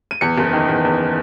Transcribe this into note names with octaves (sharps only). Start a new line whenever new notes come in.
D#7
E2 C#7
F#1
D#3
E2
E2